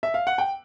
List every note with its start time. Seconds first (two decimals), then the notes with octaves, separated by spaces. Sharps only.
0.03 E5
0.14 F5
0.27 F#5
0.38 G5